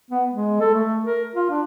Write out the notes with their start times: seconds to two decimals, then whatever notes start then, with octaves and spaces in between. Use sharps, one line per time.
0.11 B3
0.32 G#3
0.61 A4
0.74 A3
1.05 A#4
1.36 F4
1.50 D4